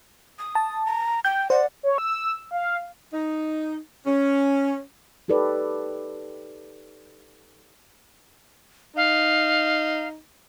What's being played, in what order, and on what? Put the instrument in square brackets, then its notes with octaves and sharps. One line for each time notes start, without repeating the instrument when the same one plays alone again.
[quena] D#6
[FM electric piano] A5
[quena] A#5
[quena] G5 [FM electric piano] G6
[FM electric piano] C5 [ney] D5 [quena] F#5
[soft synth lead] C#5
E6
F5
[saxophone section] D#4
C#4
[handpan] D#4 G4 A4 B4 D5
[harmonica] D#4 [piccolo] F5